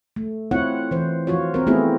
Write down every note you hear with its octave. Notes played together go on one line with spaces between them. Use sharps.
A3
C4 E4 F4 C#5 F#5
E3 C5
F3 F4 F#4 C#5
C4 A#4
A3 B3 C4 E4 F4 G#4